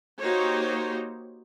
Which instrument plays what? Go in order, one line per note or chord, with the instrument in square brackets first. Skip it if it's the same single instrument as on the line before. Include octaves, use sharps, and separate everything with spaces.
[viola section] A#3 D#4 F#4 G4 C5 C#5